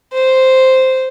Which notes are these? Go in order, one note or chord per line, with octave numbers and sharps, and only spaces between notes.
C5